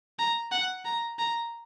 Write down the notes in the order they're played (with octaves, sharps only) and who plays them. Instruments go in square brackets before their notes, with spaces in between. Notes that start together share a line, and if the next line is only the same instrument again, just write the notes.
[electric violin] A#5
F#5
A#5
A#5